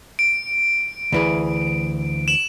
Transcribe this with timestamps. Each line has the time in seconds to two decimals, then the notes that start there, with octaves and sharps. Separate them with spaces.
0.19 D7
1.12 D2 E3 G#4
2.28 E7 F#7